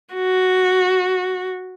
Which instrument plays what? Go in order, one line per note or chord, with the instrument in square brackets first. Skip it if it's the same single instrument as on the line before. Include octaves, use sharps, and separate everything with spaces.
[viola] F#4